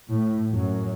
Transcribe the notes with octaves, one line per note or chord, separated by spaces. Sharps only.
A2
F#2